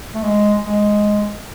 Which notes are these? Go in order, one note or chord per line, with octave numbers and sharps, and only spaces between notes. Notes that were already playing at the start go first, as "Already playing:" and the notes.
A3
G#3
G#3